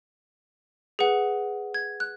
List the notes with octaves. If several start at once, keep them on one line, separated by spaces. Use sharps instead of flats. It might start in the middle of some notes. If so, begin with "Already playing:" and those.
G#4 B4 F#5
G#6
F#6